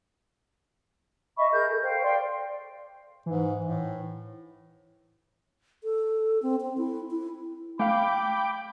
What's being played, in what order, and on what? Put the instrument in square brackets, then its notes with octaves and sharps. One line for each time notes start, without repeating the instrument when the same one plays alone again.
[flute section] D#5 E5 B5 C#6
G#4 A#4 G6
A4
C5 F5 G5
D5 F5 G5 C6
[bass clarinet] G#2 [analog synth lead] E3
[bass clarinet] A2
[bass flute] A4
C4
C4
E4
E4
[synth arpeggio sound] A3 F5 [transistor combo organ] G5 D6 [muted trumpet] B5